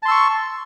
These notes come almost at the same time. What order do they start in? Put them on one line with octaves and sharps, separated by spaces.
A5 C6 E6 C#6